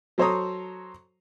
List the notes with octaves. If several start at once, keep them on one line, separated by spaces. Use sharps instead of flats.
F#3 A4 C5 C#5 A#5 D#6